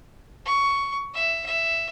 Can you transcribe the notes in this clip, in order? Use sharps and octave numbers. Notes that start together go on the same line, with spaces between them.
C#6
E5
E5